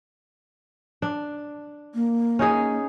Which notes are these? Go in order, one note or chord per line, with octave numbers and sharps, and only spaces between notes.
D4
A#3
C#4 D#4 G#4